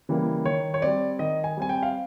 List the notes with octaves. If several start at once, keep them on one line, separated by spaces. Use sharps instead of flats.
C#3 E3 G3 A#3
D#3 C#5
C#5
G3 C4 D5
D#3 D#5
G#5
G3 C4 G#5
G5
F5